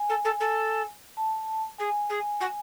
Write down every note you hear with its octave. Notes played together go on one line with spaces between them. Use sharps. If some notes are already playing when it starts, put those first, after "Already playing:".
Already playing: G#5
A4
A4
A4
A5
G#4 G#5
G#4
F#4